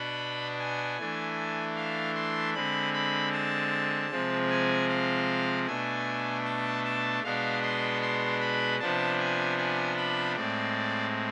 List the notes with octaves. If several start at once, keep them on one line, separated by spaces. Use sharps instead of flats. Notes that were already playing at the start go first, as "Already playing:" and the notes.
Already playing: B2 B3 D4 B5
G#5
E3 A3 D4
F5
C6
D3 G#3 C4 B5
B5
A5
C3 F3 G#3 C4
G#5
F5
B2 A3 D4 G#5
A5
A5
B2 G#3 B3 D4 F5
C6
C6
B5
C3 F3 B3 D4 A5
G#5
G#5
B5
A2 G#3 C4 D5